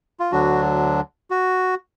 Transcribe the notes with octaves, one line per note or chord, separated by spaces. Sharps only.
F4
D2 D3 F#3 D4 F#4
F#4